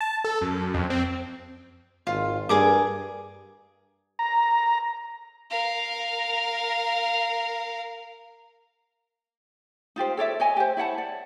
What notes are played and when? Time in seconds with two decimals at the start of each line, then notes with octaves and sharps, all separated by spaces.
0.01 A5
0.24 A4
0.41 F#2
0.74 F2
0.90 C4
2.07 G#1 F4
2.49 G2 G#4 A#4 D6
4.19 A#5
5.50 A#4 F5
9.96 D#4 F4 G4 C5
10.17 A4 C#5 D5 E5
10.40 C#5 D#5 G#5
10.57 G4 C5
10.77 E4 C#5 F#5 A5
10.98 D5